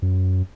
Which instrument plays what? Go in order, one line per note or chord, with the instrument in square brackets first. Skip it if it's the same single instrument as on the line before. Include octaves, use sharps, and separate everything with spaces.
[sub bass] F#2